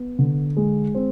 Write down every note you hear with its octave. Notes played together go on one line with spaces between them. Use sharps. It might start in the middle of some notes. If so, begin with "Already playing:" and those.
Already playing: B3
D3
G#3
C4